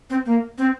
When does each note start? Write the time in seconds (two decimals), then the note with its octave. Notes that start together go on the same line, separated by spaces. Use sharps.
0.10 C4
0.26 A#3
0.58 C4